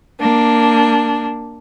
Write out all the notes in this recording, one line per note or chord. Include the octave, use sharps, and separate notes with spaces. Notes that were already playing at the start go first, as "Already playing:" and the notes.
A#3 D4